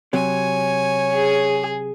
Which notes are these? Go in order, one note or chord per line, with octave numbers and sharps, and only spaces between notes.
C3 F#3 C#5 G#5
G#4